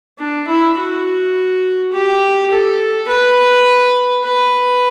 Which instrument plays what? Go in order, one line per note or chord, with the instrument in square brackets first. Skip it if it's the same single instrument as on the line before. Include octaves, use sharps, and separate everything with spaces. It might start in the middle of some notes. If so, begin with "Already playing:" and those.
[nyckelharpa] D4
E4
F#4
G4
A4
B4
B4